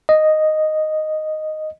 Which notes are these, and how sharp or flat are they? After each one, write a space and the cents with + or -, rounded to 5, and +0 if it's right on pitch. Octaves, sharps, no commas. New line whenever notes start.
D#5 -5